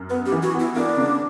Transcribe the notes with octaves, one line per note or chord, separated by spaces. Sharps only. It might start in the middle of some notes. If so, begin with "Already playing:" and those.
Already playing: F#2
B3 B4
G4
E3
F#4
B3
E4
A#3 D4
C#3